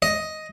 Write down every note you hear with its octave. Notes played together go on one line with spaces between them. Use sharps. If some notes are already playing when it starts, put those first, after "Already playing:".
D#5